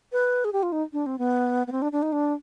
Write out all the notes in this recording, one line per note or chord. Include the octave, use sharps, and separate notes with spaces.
B4
G#4
G4
F4
D#4
D4
C4
B3
B3
C4
D4
D4
D#4
D4